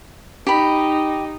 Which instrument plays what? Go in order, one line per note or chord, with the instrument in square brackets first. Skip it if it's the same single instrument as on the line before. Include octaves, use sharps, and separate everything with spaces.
[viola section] D#4 [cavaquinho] G4 B5